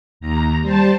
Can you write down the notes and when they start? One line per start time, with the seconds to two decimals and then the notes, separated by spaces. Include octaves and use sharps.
0.20 D#2 A#5
0.61 G3 C5 A5